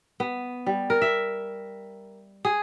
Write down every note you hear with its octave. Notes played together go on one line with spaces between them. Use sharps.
B3
G3
A#4
E5
G#4